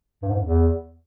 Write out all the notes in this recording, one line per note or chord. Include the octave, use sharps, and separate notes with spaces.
G2
G#2
F#2
E2